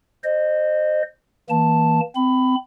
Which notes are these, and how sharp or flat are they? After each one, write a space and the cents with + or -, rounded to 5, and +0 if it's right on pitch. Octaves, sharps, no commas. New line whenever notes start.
C5 -5 D#5 -25
E3 -30 A#3 +0 A5 +0
C4 -25 B5 +20